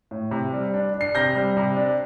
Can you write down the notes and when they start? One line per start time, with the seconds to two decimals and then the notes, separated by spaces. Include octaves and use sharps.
0.11 A2
0.31 C3
0.53 G3
0.74 D4
0.94 D4
1.01 C7
1.15 C3 G6 A#6
1.35 G3
1.57 C3
1.77 D4